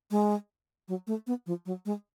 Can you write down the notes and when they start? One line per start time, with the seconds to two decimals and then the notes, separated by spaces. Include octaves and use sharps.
0.11 G#3
0.88 F#3
1.07 A3
1.27 B3
1.46 F3
1.66 F#3
1.85 G#3